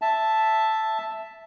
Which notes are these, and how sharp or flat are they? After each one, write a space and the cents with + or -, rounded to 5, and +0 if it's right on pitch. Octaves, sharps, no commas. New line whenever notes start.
E5 +0 A5 +0